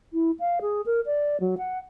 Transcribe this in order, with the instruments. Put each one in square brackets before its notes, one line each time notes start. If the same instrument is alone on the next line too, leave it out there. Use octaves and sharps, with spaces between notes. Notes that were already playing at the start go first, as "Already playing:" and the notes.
[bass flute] E4
F5
G#4
A#4
D5
F#3
F#5